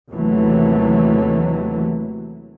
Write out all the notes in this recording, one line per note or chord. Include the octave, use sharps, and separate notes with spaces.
D#2 C3 E3 F#3 A3